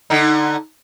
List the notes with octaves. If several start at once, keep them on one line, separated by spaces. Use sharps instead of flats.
D3 D#4